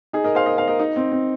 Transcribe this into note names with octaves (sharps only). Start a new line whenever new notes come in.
D#4 G#4
A#4 D#5
C5 F5
A#4 D#5
C5 F5
A#4 D#5
D#4
C4
C4